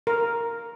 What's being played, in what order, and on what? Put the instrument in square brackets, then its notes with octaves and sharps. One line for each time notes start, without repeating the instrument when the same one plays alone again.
[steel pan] A#4